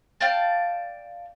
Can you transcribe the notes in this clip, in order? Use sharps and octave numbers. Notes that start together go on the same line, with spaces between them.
D5 F5 G5 A5